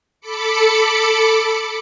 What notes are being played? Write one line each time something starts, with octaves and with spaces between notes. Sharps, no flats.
A4 B5 D6 C#7